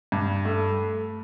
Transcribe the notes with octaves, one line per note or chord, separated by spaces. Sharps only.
G2
A3